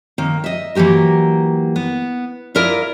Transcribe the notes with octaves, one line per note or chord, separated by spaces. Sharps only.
D#3 A#3
D#5 E5
E3 F#3 A#3 G4 A#4
B3
E4 F4 A#4 D5 E5 F5